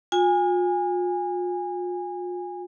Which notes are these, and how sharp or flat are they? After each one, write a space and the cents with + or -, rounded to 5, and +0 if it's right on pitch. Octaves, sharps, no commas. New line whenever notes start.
F4 +40 G#5 -20